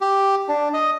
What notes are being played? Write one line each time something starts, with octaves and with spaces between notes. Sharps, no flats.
G4
D4
D#5